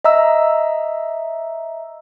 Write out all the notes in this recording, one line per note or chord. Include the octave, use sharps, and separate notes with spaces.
D#5 E5 A#5 E6